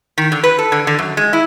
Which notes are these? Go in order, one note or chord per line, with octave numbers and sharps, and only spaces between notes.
D#3
D3
B4
A4
D3
D3
F#2
G#3
E4